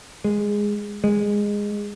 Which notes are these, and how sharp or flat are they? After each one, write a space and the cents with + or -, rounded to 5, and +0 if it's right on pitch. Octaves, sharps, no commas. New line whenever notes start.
G#3 -10
G#3 -15